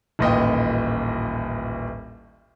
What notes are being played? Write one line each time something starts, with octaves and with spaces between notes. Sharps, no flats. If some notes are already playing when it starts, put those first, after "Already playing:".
D#1 A1 A#2 D#5 G5